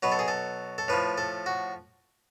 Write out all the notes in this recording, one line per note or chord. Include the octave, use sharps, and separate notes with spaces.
B2 F#3 B4
A4
G#4
A4
A4
A2 F3 B4
A4
F#4